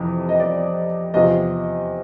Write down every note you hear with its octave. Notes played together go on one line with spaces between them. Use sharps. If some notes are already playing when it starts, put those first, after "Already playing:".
Already playing: F2 C3 E3
D#5
D5
E2 C3 F3 D#5